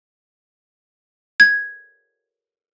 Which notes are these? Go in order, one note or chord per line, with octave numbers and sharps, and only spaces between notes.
G#6